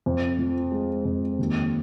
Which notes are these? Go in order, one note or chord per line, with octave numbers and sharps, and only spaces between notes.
F2
F3
G#3
F2
D#2